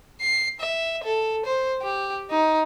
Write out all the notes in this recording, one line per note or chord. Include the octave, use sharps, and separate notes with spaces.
C7
E5
A4
C5
G4
D#4